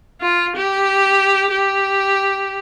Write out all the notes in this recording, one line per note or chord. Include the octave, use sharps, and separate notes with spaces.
F4
G4
G4